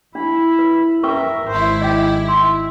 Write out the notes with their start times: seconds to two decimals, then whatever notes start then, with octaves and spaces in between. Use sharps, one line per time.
0.15 D4 E4 B5
0.59 B4
1.03 C#4 A#4 B4 E5 C#6
1.48 G#1 E4 C5
1.81 G4 D#5 G5
2.28 E5 C6